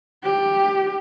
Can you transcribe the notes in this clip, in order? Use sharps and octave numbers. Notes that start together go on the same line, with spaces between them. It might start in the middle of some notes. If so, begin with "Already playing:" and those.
G4